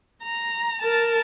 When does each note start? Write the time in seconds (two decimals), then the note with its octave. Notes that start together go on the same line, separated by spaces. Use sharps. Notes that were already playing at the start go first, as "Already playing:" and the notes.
0.23 A#5
0.82 A#4 A5